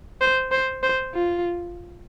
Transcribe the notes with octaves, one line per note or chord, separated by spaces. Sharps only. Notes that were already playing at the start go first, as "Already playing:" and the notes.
C5
C5
C5
F4